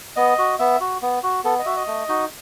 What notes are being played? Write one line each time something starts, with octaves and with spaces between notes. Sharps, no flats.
B3 D#5
F#4
B3 E5
F#4
B3
F#4
B3 A4
D#5
F#4 E5
D#5
A3
D#4 F#4